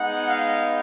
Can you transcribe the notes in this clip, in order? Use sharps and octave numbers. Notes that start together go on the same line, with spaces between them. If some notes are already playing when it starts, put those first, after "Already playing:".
Already playing: G#3 B3 D#4 F#5
F5